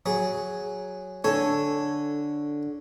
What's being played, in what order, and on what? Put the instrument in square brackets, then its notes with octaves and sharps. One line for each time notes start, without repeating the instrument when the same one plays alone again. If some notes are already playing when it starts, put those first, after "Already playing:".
[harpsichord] F#3 G#4
[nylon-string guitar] D3 A4 [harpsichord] C#5 G#5